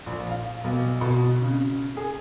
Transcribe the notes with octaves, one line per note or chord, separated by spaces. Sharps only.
A#1
F5
B1
B2
C#3
G#4